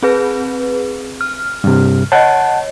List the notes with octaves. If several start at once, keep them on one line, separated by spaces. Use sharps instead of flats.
C4 G#4 B4
F6
G2 C3
C#5 D#5 F#5 A5